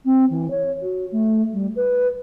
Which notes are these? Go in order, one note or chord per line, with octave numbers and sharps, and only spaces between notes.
C4
E3
C#5
F#4
A3
G3
B4